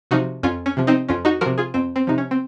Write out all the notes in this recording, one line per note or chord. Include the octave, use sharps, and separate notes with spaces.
C3 F3 D#4 F#4
F2 C#4 F4
C#4
C3 F3
C4 D#4
F2 C#4 F4
D#4 F#4
C3 F3 F#4 A#4
F4 G#4
F2 C4
C4
C3 F3 D#4
C#4
C4